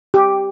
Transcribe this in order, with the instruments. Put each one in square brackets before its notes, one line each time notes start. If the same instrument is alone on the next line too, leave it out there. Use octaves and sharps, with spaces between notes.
[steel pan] G4